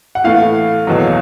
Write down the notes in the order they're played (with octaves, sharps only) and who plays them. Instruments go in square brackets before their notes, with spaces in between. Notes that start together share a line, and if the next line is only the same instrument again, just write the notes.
[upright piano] F#5
A2 E3 A3 F5
E2 B2 F#3